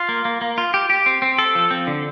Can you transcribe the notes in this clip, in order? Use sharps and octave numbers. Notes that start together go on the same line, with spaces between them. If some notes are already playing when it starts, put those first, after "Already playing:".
Already playing: F4
A#3
A#3
A#3
F4
G4
G4
C4
C4
A4
F3
C4
D3